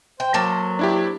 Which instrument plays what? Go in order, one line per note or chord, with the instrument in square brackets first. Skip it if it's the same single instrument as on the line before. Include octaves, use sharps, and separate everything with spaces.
[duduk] C5 [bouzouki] G5
[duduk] F#3 [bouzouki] A#3 A4 C5
[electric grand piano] D4 E4 G4